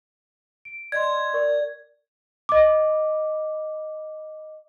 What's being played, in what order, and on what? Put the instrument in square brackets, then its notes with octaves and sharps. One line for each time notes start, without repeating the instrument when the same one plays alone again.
[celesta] D7
[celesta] D5 D#5 C6 [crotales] G#6
[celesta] A#4 D5 C#6
D#5 D6